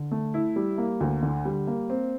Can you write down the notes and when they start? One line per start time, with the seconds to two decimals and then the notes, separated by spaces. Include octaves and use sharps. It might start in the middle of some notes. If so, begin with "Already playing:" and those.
Already playing: D3
0.11 A3
0.34 E4
0.56 G3
0.78 A#3
1.01 D2
1.23 D3
1.45 G3
1.67 A#3
1.90 C4